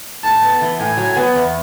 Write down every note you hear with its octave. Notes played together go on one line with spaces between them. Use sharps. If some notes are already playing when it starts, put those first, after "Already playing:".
A2 A5
B3
E3
A2 G#5
F#3
B3
E2